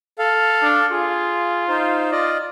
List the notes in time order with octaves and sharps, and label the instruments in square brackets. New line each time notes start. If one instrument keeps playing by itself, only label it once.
[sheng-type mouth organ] A4 F5
[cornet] D4
[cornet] F4 [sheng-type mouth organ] G#4
[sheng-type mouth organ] D#4 C5
F4 D5 D#5